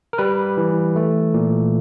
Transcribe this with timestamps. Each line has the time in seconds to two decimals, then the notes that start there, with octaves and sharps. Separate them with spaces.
0.13 A#4
0.18 G3 B4
0.57 E3
0.96 A3
1.34 A#2